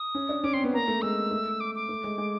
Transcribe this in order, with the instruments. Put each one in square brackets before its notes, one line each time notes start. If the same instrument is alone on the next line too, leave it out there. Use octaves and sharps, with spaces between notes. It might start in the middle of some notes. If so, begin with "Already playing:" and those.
Already playing: [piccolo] D#6
[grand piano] C#4
D4
[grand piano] C#4 [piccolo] D6
[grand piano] C4 [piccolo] C6
[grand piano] B3
[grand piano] A#3 [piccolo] A#5
[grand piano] A3
[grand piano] G#3 [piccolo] E6
[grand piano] A3
[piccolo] D6
D6
[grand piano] A3
G#3
G#3